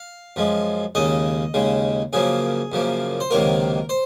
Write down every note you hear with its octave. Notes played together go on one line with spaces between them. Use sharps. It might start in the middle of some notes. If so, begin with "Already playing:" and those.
Already playing: F5
F#2 F3 G#3
D#2 C#3 G#3 D#5
D#2 C#3 G#3
F#2 C#3 F3 A#3 G#4
F#2 C#3 F3 A#3
C5
C#2 C3 D#3 F#3 A#3 A#4
C5